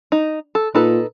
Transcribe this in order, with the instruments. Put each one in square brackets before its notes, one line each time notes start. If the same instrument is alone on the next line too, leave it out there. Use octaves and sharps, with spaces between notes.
[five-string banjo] D#4
A4
[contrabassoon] A#2 [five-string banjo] D#4 A4 B4